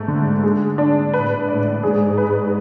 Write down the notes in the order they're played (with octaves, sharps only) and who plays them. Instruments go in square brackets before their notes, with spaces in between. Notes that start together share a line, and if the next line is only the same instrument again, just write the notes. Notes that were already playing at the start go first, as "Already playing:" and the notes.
Already playing: [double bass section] G#2 [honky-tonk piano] A3
[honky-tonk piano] D3
G#3
D4
[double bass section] A2 [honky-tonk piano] B4
[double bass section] A2 [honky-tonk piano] D5
[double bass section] G#2 [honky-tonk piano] G#4
[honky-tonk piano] B4